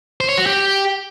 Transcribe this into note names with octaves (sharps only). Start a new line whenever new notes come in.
C5
C#5
F#4
G4